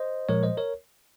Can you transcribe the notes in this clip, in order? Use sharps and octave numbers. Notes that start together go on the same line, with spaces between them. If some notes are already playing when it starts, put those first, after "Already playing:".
Already playing: C5 D#5
A#2 F3 G#3 A#4 C#5
C5 D#5
A#4 C#5